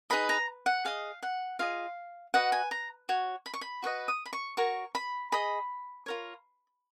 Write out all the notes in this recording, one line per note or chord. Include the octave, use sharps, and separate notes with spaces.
D#4 G#4 B4 D#5 B5
A#5
F#5
G#4 D#5 F5
F#5
F4 G#4 D#5 F5
F#4 B4 D#5 F#5
G#5
A#5
F#4 C#5
B5
C#6
B5
F#4 B4 D#5 C#6
D#6
B5
C#6
F#4 A#4 C#5 C#6
B5
G#4 D#5 B5
F4 A#4 C#5